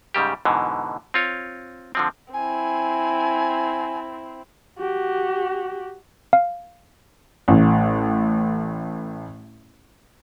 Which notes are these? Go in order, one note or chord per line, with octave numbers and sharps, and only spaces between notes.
G#2 C#3 G3 G4
G#2 B2 D3 E3
C4 F4 C#5
D3 F3 C4
C4 E4 G#5
F#4 G4
F5
A1 A2